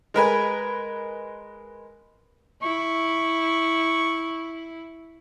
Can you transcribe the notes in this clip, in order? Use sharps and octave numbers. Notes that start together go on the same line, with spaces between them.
G#3 A#4 B4 G#5
E4 C#6